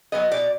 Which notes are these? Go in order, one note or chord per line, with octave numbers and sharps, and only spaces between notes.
F#3 B3 D#5
B2 D5